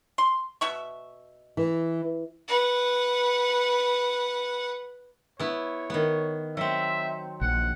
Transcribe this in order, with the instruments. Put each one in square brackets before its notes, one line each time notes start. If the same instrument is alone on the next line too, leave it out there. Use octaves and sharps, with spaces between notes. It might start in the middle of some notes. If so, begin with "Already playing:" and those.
[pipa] C6
B2 E5 C#6
[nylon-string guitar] E3
[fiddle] B4 F#5
[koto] B3 E4 [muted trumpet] C#5
[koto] D#3 B3
[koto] F#3 C4 [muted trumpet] E5
[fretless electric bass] A#1 [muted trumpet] F#5